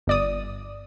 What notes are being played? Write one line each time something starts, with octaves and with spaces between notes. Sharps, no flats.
G1 D5 D#6